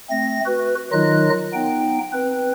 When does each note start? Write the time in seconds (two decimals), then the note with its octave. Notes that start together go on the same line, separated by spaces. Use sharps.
0.10 A3 C4 A#6
0.46 F#4 B4
0.92 D#3 F#3 D#4 F4 D#5 F#6
1.53 B3 D#4 G5
2.13 C4 B4